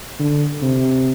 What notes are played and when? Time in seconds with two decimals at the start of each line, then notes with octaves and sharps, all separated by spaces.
0.19 D3
0.62 C3